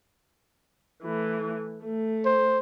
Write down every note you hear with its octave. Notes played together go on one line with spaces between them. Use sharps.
E3 A3
A3
C5